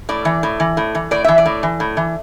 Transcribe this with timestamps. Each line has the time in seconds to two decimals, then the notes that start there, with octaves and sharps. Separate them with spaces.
0.09 A2 D5
0.25 E3
0.43 A2
0.60 E3
0.77 A2
0.95 E3
1.11 A2 D5
1.24 E3 E5
1.38 D5
1.46 A2
1.63 E3
1.80 A2
1.97 E3